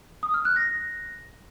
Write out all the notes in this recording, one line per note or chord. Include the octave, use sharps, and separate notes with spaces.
D#6
F6
F#6
A#6